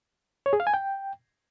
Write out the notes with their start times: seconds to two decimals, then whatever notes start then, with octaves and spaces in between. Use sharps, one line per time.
0.46 C#5
0.53 G#4
0.60 F5
0.67 G#5
0.74 G5